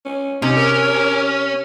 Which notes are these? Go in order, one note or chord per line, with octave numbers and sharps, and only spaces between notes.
C#4
C3 C#4 D#4
A#4